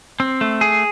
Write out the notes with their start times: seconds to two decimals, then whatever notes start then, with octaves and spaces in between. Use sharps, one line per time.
0.20 C4
0.41 A3
0.61 G#4